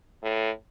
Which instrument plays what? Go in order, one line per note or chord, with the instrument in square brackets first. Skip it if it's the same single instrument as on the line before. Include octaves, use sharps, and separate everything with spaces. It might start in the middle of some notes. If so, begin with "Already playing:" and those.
[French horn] A2